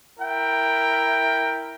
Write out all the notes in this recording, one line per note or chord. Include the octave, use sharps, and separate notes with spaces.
E4 A#4 G5